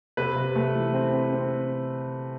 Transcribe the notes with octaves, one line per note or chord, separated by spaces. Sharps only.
C3 B4
C3
A3
E3
C4
C4
C4